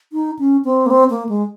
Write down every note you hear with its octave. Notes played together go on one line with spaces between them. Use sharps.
D#4
C#4
C4
A#3
C4
A#3
G#3